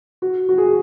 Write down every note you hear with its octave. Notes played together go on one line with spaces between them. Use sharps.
F#4
F#4
G#4
F#4